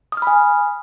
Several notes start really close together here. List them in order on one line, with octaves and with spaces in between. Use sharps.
D#6 F6 B5 G#5